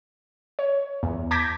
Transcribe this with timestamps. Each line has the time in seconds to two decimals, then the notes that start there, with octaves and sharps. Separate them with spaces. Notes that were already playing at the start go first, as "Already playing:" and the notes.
0.59 C#5
1.03 E2
1.31 A5 D6 G6 G#6 A#6 B6